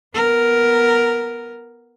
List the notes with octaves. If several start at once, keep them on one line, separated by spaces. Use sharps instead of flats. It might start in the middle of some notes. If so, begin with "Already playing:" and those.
B3 A#4